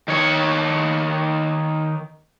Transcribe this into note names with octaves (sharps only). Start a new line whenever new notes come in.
D#3 C#5